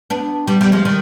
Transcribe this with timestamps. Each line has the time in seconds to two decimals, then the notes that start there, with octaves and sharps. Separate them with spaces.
0.10 B3 D4
0.47 G3 B3
0.61 G3 B3
0.72 F3 G#3
0.85 D#3 G3